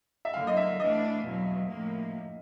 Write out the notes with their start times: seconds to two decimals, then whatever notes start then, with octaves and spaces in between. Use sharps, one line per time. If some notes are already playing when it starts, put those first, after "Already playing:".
0.25 E5
0.33 D3 F#3 A#3 F5
0.47 D#5
0.57 E5
0.79 E3 A3 D4 D#5
1.24 E2 B2 F#3
1.69 A2 F3 A#3